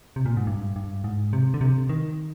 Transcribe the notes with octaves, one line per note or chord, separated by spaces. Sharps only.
C3
A#2
G#2
G2
G2
G#2
C3
D3
C3
D#3